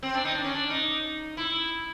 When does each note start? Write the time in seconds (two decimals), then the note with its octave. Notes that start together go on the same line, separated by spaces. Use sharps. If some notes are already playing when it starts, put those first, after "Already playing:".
0.03 C4
0.14 D4
0.25 D#4
0.35 D4
0.44 C#4
0.54 D4
0.70 D#4
1.37 E4